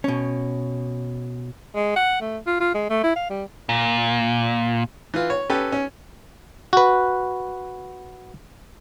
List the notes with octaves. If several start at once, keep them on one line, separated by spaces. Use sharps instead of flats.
B2 C#4
G#3
F#5
A3
F4
F4
G#3
A3
E4
F5
G3
A#2
E3 F4
C#5
C#4 G4 A4 B4
C#4
F#4 B4